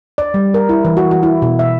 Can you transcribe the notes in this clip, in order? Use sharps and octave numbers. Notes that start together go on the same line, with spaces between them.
D5
G3
A#4
E4
E3
F#4
F#4
E4
B2
E5